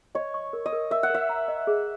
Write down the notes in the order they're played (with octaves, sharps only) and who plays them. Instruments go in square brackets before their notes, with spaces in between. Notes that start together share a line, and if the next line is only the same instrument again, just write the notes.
[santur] C#5 [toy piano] D#5
[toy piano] C#6
A#4
[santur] D#5
[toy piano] A#4
[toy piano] A#4 [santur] E5
[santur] F#5
[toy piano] A#4 [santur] E5
[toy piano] A#5
D#5
G#4